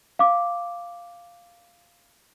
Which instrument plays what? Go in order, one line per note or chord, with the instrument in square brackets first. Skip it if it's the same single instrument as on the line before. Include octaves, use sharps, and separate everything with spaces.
[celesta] F5 D6